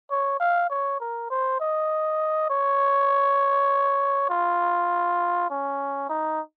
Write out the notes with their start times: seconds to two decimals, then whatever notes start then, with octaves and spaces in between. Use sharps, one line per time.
0.11 C#5
0.40 F5
0.70 C#5
1.00 A#4
1.31 C5
1.61 D#5
2.50 C#5
4.30 F4
5.50 C#4
6.09 D#4